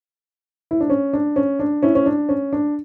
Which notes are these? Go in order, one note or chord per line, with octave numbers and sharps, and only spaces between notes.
E4
D4
C#4
D4
C#4
D4
C#4 E4
C#4
D4
C#4
D4